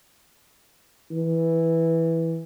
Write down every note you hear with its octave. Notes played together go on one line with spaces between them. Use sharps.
E3